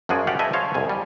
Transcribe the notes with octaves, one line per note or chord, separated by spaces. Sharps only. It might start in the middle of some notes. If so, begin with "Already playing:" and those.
F#2 F3 F#4 G#4 D5
F#4 G4 D5 F5 F#5
G4 G#4 B4 D#5 E5 A5
G#4 C5 C#5 F5 A5
C2 F2 G#5
G3